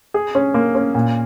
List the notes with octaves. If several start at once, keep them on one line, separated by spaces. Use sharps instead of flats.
G#4
C#4
A#3
C#4
A#2